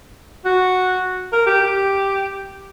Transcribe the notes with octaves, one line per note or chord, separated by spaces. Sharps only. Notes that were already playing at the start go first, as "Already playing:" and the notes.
F#4
A#4
G4
G4